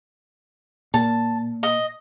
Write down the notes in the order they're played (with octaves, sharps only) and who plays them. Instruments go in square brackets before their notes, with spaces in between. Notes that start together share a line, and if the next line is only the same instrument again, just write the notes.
[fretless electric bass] A#2 [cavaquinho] A5
[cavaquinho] D#5